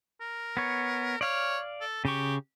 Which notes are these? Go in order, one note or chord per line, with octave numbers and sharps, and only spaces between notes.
A#4
B3 C#5
C#5 D5 F5 F6
A4
C#3 G4 C#6